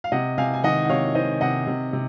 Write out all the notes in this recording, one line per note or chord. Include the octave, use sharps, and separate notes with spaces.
F5
C3 D#5 F#5
C3 F5 G#5
G#5
D#3 D#5 F#5
F#5
C3 C#5 F5
D#3 C5 D#5
C3 D#5 F#5
C3
C3